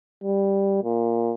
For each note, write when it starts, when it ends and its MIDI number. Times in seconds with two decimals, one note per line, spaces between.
0.23 0.81 55
0.84 1.34 46